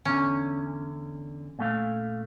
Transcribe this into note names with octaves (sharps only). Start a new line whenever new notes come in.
E2 D3 C#4
A#2 A3 F5